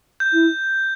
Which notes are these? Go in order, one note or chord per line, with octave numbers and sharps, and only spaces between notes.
G6
E4